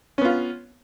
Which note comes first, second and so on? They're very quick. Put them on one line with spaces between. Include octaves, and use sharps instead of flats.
C#4 B3 F4